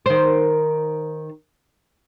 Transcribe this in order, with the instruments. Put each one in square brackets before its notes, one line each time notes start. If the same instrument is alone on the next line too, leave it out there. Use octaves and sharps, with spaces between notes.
[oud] D#3 C5